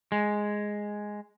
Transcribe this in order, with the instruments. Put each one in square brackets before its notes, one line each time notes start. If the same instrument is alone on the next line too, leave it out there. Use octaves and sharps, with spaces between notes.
[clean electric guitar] G#3